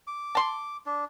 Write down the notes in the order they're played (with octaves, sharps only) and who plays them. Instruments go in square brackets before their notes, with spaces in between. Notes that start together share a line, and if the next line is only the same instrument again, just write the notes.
[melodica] D6
[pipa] A5 C6
[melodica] D4